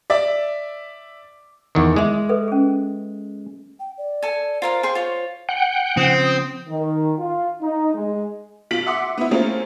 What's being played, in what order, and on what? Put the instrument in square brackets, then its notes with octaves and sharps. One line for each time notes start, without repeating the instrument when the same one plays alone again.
[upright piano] D5 E5 D6
[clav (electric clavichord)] E2 D#3
[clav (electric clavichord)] G#3 [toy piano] E5 C6 D6
[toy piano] A4 B4 E5
C#4 G#4
[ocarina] G5
D5
[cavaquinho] A4 G#5
[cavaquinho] F4 A#4 F5 [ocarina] C5
[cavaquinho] G#4 G5 C6
F4 C#5
[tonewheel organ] F#5 G5
[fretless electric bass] C#3 F3 [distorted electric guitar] C4 [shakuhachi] D#6
[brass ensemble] D#3
F4
D#4
G#3
[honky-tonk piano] B1 F4 B6 D7 F#7
E5 F#5 C6 D6
B3 E4
A3 A#3 C4 C#4 F4 G#4